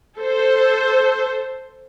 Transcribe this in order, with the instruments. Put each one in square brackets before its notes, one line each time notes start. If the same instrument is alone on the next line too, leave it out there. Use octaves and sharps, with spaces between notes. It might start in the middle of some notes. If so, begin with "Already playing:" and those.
[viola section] A4 C5